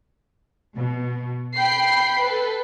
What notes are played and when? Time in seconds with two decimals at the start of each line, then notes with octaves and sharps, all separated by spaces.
0.75 B2
1.56 G5 B5 C7
2.21 A4 B4